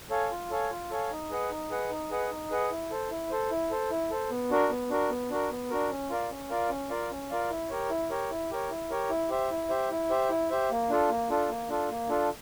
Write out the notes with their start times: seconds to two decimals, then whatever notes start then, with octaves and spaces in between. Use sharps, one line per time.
0.10 A4 C#5 F5 G#5
0.31 F4
0.50 A4 C#5 F5 G#5
0.71 F4
0.91 A4 C#5 F5 G#5
1.11 D#4
1.30 G#4 B4 D#5 F#5
1.51 D#4
1.70 G#4 B4 D#5 F#5
1.90 D#4
2.10 G#4 B4 D#5 F#5
2.31 D#4
2.50 G#4 B4 D#5 F#5
2.71 E4
2.90 A4 C5
3.11 E4
3.31 A4 C5
3.51 E4
3.71 A4 C5
3.91 E4
4.10 A4 C5
4.30 B3
4.51 D4 F#4 A#4
4.70 B3
4.90 D4 F#4 A#4
5.10 B3
5.30 D4 F#4 A#4
5.51 B3
5.70 D4 F#4 A#4
5.91 C#4
6.10 F4 A#4 D5 F5
6.30 C#4
6.50 F4 A#4 D5 F5
6.70 C#4
6.90 F4 A#4 D5 F5
7.11 C#4
7.30 F4 A#4 D5 F5
7.49 E4
7.70 G4 A#4 C#5
7.90 E4
8.10 G4 A#4 C#5
8.30 E4
8.51 G4 A#4 C#5
8.70 E4
8.90 G4 A#4 C#5
9.10 E4
9.29 G4 C5 E5
9.51 E4
9.69 G4 C5 E5
9.91 E4
10.10 G4 C5 E5
10.30 E4
10.49 G4 C5 E5
10.70 A#3
10.90 D4 F4 A4
11.09 A#3
11.30 D4 F4 A4
11.49 A#3
11.69 D4 F4 A4
11.89 A#3
12.09 D4 F4 A4